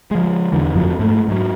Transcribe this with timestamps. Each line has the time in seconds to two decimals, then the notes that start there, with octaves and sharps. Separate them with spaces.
0.11 F3 G#3
0.52 E2 D3 E3
0.74 G1 F2 F3 F#3
0.99 G#2 A3
1.28 G#2 F#3